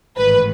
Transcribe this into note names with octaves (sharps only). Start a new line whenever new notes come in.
A1 G#2 D#3 B4